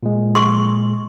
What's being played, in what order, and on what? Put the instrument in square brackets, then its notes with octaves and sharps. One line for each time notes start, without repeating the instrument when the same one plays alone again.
[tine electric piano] A#2 G#3
[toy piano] C6 C#6